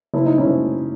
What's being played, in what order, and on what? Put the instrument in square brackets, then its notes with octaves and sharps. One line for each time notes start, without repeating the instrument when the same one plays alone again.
[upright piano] F#1 E4
D#4
C#4 E4
F#1